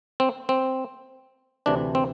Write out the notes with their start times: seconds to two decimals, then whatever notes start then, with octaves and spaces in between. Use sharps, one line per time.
0.20 C4
0.49 C4
1.66 D2 C3 E3 D4
1.95 C4